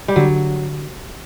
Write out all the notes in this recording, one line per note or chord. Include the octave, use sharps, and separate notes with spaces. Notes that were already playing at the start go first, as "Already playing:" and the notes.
G3
D3 F#3